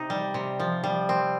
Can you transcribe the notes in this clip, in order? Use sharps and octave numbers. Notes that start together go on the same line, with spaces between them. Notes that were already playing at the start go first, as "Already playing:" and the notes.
Already playing: C3 D#4
G3
C3
F3
G3
C4